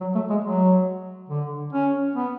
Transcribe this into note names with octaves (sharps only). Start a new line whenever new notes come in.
F#3
A3
G#3
F#3
D3
C#4
B3